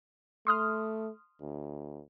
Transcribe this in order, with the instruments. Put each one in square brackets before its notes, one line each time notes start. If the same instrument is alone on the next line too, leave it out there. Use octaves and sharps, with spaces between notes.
[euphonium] A3 [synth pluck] C6 D#6 F6
[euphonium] D2